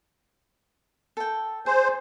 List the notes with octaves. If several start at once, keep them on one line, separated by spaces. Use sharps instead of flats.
A4 G5
G#4 C5 D5